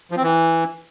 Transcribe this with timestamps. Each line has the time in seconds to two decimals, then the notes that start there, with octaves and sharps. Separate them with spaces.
0.11 F3
0.17 C4
0.23 E3